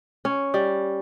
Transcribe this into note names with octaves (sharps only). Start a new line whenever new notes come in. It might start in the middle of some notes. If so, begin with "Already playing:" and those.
C#4
G3